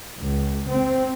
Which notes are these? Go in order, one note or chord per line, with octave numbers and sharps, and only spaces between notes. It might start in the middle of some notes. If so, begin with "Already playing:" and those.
C#2
C4